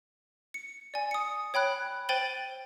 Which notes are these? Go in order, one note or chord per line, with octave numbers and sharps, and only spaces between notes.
C#7
D5 G#5
D#6 C#7
C#5 G5 B5 F#6
C5 G5 A6 D#7 F#7 G7